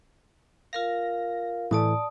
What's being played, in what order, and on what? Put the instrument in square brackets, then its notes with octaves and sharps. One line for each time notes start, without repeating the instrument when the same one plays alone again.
[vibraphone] F4 A#4 F5 [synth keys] A#6
[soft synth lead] A2 [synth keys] E3 A3 [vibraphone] D5 A5 D#6